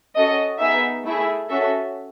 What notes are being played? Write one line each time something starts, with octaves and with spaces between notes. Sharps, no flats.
C#4 F#4 A4 D#5
B3 D#4 G#4 E5
A3 E4 G#4 E5
C#4 F#4 A4 E5